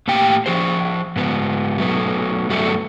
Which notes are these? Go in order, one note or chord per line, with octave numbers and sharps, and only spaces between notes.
A2 A#3 G4 G5
F3 G#4 C5
G#2 B3
F#3 A3 B3
G2 F#3 A3 B3